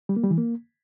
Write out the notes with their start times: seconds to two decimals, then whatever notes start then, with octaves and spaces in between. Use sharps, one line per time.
0.09 G3
0.16 A#3
0.24 G3
0.31 E3
0.38 A#3